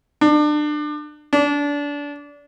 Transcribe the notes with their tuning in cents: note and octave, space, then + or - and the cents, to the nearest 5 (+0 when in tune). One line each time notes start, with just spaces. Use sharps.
D4 +30
D4 -25